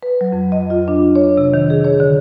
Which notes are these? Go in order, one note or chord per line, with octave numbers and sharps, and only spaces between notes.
B4
F#3
F2
D#5
F4
D4
C#5
C3
D#3
G#4
C#5
D3